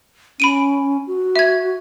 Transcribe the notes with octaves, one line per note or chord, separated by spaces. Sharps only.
C#4 B5 D7 D#7
F#4
E5 G#6